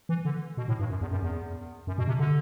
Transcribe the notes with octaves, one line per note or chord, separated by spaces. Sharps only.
E3
D3
B2
A2
G2
F#2
E2
F#2
E2
F#2
B2
C3
D3